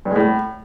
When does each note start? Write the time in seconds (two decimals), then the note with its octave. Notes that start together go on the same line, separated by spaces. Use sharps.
0.05 G2
0.11 G#3
0.16 A2